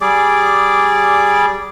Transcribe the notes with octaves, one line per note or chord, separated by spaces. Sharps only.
G3 G#4 D5 D6